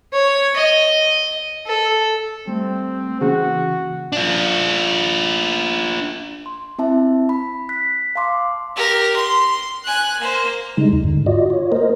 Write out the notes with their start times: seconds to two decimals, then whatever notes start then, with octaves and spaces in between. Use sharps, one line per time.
0.13 C#5
0.56 D#5
1.66 A4
2.47 G3 A3 C4
3.21 C#3 E3 A#3 C#4 F#4 G#4
4.12 D4 F4
6.46 C6
6.79 C4 E4 E5 A5
7.29 B5
7.69 F#6 B6
8.16 F5 A5 C6 D6
8.76 G4 A#4
9.16 C6
9.84 G#5 F#6
10.19 A#3 C5
10.77 C#3 G3 G#3 D#4
10.93 D#2
11.04 G#2 D3
11.26 F4 F#4 D5 D#5
11.50 F4 C#5
11.72 A#3 A#4 C5 D#5